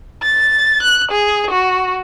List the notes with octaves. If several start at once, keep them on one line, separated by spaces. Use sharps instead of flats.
A6
F#6
G#4
F#4